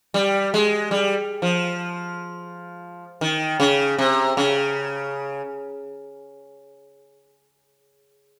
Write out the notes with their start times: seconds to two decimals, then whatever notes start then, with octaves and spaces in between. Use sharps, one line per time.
0.14 G3
0.54 G#3
0.91 G3
1.42 F3
3.21 D#3
3.60 C#3
3.98 C3
4.37 C#3